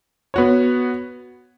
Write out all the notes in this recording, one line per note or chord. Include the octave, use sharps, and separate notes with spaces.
B3 F#4 C#5